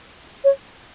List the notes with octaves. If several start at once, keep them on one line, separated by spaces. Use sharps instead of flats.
C#5